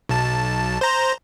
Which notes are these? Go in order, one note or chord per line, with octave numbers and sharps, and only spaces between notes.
B1 A5
C5 A#5